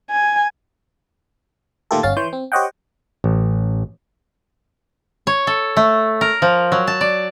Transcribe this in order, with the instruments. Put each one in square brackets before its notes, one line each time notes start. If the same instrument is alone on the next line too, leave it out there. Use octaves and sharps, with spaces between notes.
[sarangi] G#5
[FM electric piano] A#2 D#3 A3 F4 G4 A4
G1 C#4 F5 A6
E3 C#5 C6 G6
C4
G4 C5 C#5 D#5 F#5 G5
[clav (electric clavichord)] A1
[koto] C#5
A4
A3
A#4
F3
F#3
A5
D5